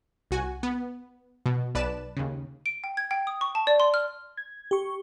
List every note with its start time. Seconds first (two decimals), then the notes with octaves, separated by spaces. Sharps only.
0.31 C2 F#4 G#5
0.63 B3
1.46 B2
1.75 B1 B4 D5 A5 E7
2.17 D#2 C#3
2.66 D7
2.84 G5
2.97 G#6
3.11 G5
3.27 D#6
3.41 C#6
3.55 A5
3.67 D5
3.80 C6
3.94 F6
4.37 G#6
4.71 G4 C#6